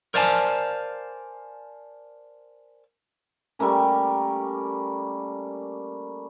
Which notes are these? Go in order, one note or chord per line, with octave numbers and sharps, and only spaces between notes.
A#4 C5 D5 F5 G#5 A5
G3 A3 A#3 C#4